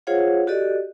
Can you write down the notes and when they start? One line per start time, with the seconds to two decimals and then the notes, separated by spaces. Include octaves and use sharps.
0.07 F4 G#4 C5 C#5 F5 F#5
0.47 F#4 G4 A4 D5 D#5